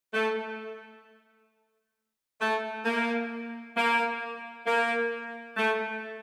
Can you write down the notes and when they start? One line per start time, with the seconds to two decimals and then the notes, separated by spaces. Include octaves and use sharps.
0.13 A3
2.40 A3
2.85 A#3
3.76 A#3
4.66 A#3
5.57 A3